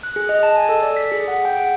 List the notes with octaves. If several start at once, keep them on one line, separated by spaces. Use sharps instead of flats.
F#6
G#4
D#5
A5
G#5
A4
D5
B6
G#4
F#5
G5
F#5